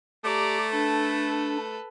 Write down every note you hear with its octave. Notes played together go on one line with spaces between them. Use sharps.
A3 G4 D5 A#5
D4 A4 B4